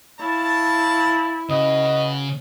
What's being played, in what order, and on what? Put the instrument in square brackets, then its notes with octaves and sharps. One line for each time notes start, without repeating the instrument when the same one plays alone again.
[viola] E4 [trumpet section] C#5 F5 A5
[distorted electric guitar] C#3 [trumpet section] F#4 B4 [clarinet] D#5